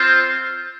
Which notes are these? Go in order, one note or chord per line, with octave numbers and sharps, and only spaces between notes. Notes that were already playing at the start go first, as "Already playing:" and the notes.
Already playing: C4 F4 C5